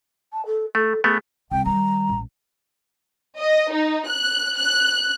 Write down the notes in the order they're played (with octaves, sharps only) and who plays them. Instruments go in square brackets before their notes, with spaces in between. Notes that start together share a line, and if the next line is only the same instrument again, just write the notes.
[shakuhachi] A5
A4
[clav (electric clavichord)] A3 [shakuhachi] A4
[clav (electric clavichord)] A3 B3 [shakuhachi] G#4
[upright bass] C2 [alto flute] G5
[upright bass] D#3 G3 [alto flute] A#5
[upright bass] A1
[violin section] D#5
D#4
F#6
F#6